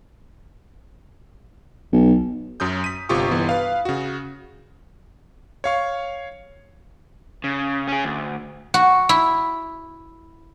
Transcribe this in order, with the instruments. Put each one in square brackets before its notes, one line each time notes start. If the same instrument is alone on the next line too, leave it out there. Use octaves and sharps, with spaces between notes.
[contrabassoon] B1
[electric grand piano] F#2 F#3 D#6 G6
B6 D#7
G1 C3 F4 G4 C#6 D#6
G1 E3 B3 F4
B4 F5
C#3 F#4
C#5 F5 C#6
[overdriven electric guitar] C#3
C#4 G#4
D2
[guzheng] F#4
E4